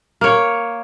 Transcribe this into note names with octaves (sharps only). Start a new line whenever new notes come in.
A#3 C#5